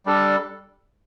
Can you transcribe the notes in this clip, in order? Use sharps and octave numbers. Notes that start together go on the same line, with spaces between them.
G3 D4 A4